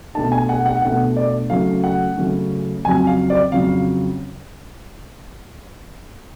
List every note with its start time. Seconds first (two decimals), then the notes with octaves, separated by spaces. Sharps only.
0.15 B2 A3 D4 A5
0.32 G#5
0.49 F#5
0.66 F#5
0.82 B2 A3 D4 F#5
1.17 D5
1.50 C#3 F#3 A3 C#4 F5
1.84 F#5
2.17 C#3 F#3 A3 C#4
2.85 F2 C#3 F#3 G#5
3.07 F5
3.30 D5
3.52 F2 C#3 F#3 F5